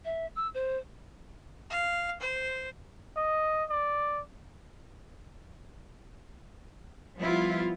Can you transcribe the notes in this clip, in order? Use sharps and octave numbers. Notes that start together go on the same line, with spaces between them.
E5
E6
C5
F5
C5
D#5
D5
F3 G3 B3 E4 F4